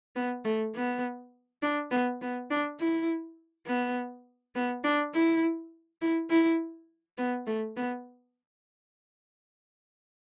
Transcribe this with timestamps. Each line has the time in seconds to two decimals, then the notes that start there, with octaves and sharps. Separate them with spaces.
0.16 B3
0.45 A3
0.75 B3
1.62 D4
1.91 B3
2.21 B3
2.51 D4
2.79 E4
3.67 B3
4.55 B3
4.84 D4
5.14 E4
6.02 E4
6.30 E4
7.18 B3
7.47 A3
7.77 B3